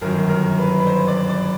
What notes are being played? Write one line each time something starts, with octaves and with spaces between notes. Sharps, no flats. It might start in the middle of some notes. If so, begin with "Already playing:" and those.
G1 F#2 D#3 F#3 A#4
A#4
B4
B4
C5
D5
D5